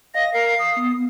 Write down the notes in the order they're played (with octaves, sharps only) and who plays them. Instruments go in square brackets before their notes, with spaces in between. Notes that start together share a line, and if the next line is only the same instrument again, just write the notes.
[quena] D#5 [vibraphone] F5 [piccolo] A#6
[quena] A#4 [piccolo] C7
[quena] D#6
[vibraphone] B3